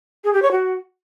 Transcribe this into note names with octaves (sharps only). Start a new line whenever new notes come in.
G#4
G4
C#5
F#4